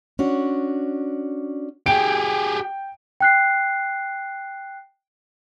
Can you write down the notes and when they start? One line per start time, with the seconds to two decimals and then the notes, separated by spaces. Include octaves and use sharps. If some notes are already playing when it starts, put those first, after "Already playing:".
0.19 C#4 D4 F#4
1.86 G4 G#4 G5 D7
3.21 G5 F#6 C7